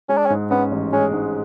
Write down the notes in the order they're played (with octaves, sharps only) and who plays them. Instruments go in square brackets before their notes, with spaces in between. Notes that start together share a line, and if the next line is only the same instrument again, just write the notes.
[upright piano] G#3 [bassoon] C#4
[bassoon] D4
C#4
[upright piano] G#2
[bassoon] B3 [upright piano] C#4
[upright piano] A1
[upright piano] G#3 [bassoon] C#4
[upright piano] G#2